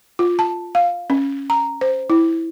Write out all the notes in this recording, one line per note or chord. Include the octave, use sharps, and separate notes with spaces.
F4
A5
F5
C#4
A#5
C5
E4